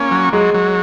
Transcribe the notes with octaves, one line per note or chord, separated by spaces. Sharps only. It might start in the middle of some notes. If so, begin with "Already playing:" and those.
Already playing: A#3 C#4
F#3
F#3 G#3
F#3